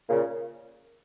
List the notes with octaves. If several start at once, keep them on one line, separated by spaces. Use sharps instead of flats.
A#2 C#3